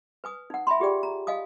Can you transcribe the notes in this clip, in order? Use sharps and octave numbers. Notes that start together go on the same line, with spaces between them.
B4 G#5 D#6
D#4 F#5
E5 G#5 B5 C6
F4 G4 G#4 D5 G5
A#5
D#5 F5 G#5 D#6